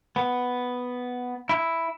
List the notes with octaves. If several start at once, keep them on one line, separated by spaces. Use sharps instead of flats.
B3
E4